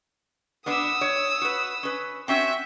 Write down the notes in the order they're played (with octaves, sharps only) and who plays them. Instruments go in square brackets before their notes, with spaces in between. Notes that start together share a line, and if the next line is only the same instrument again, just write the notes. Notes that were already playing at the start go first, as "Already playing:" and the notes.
[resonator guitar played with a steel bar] B3 D4 B4 [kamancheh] D#6 E6
[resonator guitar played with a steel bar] C#5
F#4 B4
C#4 B4
[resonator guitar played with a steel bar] C4 C#4 F#4 [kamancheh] E5 G5